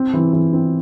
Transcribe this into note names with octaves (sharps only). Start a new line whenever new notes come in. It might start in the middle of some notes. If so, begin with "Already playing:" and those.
Already playing: C4
E3
E3
C4